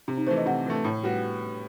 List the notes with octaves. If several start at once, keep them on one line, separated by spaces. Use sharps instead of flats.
C3
D#4
E3 A3 C5
D#5
C3 F#5
E3 A3
A2
G3 B3 F#4